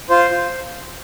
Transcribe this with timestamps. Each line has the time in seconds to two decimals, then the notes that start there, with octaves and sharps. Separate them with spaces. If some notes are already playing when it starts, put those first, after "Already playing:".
0.09 F4 C5
0.31 F4